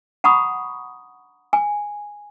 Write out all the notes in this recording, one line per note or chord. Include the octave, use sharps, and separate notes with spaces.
F#5 A#5 B5 C#6 D#6
G#5